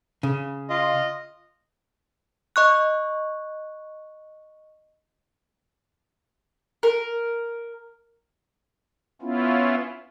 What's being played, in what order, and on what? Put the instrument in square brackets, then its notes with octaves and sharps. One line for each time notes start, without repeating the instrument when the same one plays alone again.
[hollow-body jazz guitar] C#3
[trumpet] F4 [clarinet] D#5
[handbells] D#5 C#6 F#6
[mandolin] A#4
[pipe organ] B3 C#4 E4 F4